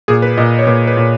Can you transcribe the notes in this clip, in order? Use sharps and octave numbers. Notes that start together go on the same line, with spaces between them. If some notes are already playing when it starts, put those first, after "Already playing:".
A#2 G#4
B4
A#2 D#5
C#5
A#2 B4
B4
A#2